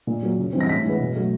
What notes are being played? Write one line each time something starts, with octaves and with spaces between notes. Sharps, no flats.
A#2
F#3 A#3
C#3
E3 G3 C4
A#6
A2 B6
E3 G#3 B3
B2
F#3 A3